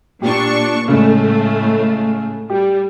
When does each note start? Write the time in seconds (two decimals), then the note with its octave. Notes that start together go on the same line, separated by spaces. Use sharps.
0.22 A#2 D4 G4 C#6
0.88 A2 C#3 G#3 A3
2.50 G3 G4